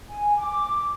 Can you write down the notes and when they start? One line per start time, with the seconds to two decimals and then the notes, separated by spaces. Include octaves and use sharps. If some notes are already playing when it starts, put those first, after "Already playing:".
0.08 G#5
0.36 D6